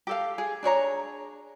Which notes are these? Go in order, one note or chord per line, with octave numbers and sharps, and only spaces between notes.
G4 A4 F5
G#4
D4 G#4 C#5 A#5